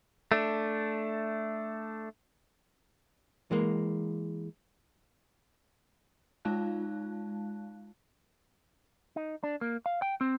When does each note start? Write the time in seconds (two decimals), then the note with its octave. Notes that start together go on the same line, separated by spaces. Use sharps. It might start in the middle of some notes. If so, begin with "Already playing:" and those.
0.32 A3 D4
3.51 E3 G#3 A#3
6.45 G#3 D#4 F4 F5 A5 F#6
9.16 D#4
9.43 D4
9.61 A#3
9.86 F5
10.02 G5
10.21 C4